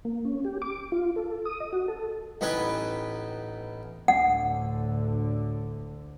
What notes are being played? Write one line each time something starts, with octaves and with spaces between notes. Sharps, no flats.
A#3
C#4
G4
D6
F4
A4
D#6
D#5
F#4
A4
A1 B3 D#4 B4 G5 G#5
D2 A2 D3 F#5